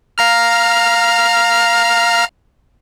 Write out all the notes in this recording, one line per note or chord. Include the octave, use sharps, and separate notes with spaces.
F5 A#5 F6